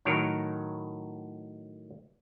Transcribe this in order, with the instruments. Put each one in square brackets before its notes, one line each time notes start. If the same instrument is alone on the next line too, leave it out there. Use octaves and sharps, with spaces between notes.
[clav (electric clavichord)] A2 D#3 F#3 A#4 C#5